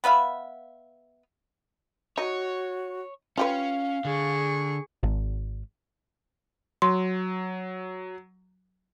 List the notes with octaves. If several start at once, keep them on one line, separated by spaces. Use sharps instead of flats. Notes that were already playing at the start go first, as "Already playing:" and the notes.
B3 B4 E5 F5
D#4 F#4 C#5
C#4 F4 G4 B4 F5
D3 G#4 C#6
G#1
F#3 C6